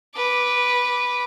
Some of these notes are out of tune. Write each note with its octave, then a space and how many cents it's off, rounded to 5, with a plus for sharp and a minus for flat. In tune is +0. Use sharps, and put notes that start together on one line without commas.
B4 -5 D6 +0